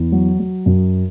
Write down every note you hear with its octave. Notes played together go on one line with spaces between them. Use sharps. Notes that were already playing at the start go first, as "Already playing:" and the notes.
Already playing: E2
F#3
F#3
F#2